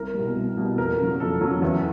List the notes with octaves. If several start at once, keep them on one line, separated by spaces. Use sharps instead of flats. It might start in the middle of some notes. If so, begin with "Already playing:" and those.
Already playing: C2 A#4
B2 G3
C2
B2 G3
F2 A#4
C#3 F#3
F2 A4
C#3 F#3
E2